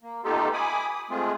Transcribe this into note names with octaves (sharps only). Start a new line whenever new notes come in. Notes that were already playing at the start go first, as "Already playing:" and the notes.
A#3
A3 B3 D#4 F4 G4 A4
G#5 B5 D6 D#6
D#6
G#3 A3 C4 F4 G#4